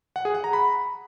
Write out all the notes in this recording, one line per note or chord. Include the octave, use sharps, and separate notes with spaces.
F#5
G#4
F#5
A#5
B5